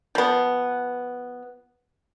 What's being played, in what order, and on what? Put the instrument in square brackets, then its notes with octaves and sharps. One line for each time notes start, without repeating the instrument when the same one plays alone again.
[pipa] F3 B3